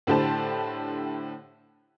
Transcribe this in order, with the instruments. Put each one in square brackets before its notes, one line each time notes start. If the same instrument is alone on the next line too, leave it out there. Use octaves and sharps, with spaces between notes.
[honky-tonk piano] A2 D3 G4 C5 A5